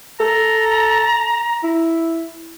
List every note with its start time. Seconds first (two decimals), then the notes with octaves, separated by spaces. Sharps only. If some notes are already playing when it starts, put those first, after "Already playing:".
0.20 A4 A#5
1.63 E4